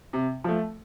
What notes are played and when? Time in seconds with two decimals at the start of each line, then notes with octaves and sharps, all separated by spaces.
0.13 C3
0.44 F3 A3